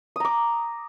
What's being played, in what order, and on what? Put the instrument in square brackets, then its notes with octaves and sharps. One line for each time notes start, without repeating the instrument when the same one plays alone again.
[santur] D#6
A#5
D6